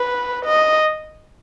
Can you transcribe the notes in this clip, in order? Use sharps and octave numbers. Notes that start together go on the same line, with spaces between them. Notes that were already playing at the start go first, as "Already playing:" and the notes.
Already playing: B4
D#5